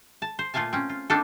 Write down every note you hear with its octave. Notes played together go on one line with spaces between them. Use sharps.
A5
C5
A#2 A3 F4 F5 G#5 A5
C4 C#4
F4
A#3 C4 D4 D#4 F4 A4